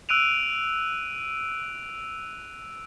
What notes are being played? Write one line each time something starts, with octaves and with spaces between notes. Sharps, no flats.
E6 F#6 D7 D#7 F7